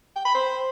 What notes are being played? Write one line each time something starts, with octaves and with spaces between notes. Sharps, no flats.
G5
B5
C5